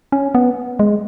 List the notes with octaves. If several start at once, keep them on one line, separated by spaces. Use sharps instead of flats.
C#4
B3
G#3